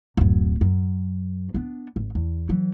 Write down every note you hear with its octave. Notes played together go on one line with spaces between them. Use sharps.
D1 F#2
F#2
B3 D4
G#1
E2
E3 F#3